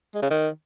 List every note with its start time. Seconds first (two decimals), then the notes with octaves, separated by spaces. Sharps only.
0.14 G#3
0.22 C#3
0.30 D#3